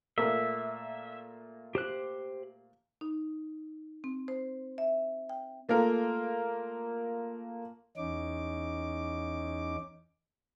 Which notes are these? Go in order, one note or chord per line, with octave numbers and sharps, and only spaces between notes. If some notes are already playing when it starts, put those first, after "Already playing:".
A#2 A3 A#3 E5
G4 C5 F#6
D#4
C4
C5
E5
G5
A3 A#3 F4 A#4
E2 C#4 D#4 D6